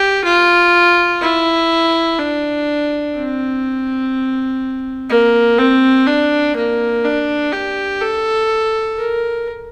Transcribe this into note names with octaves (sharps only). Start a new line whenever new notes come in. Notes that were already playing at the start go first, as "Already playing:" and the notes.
Already playing: G4
F4
E4
D4
C4
A#3
C4
D4
A#3
D4
G4
A4
A#4